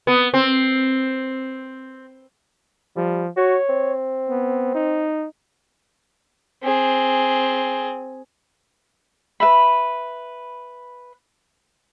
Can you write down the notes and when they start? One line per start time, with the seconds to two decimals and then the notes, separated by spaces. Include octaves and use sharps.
0.07 B3
0.34 C4
2.96 F3 G3
3.37 F#4 C#5
3.69 C4
4.29 B3
4.74 D#4
6.63 C4 G#4
9.40 B4 E5 B5